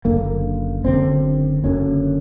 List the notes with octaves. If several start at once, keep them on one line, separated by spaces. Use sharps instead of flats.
F#1 F#2 D3 A#3
F#1 F#2 D3 C4
F#1 F#2 D3 C#4